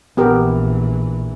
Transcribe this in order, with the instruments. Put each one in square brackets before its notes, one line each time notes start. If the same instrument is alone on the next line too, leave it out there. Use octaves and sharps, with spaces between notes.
[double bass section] A#1 E3 [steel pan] B3 G4 A#4